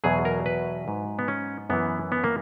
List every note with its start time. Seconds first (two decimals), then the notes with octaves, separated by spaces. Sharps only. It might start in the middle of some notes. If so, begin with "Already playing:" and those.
0.04 E2 B2 F#3 G#4
0.25 A#4
0.46 B4
0.88 G#2 F#3
1.19 B3
1.28 C#4
1.70 F#2 E3 B3
2.12 B3
2.24 A#3